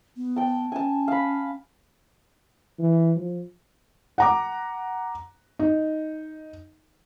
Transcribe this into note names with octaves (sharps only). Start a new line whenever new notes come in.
B3
G5 A5
C#4 G#5 A5
F5 B5
E3
F3
F#5 A#5 D6
D#4